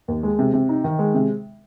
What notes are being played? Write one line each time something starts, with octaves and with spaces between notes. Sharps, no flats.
D#2
G#3
C3
C3
D#4
D#3
G#3
C3